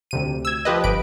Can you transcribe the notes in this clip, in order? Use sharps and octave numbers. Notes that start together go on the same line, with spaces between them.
D2 C3 D#7
E6 G#6
F3 G4 B4 D#5
G1 B4 D7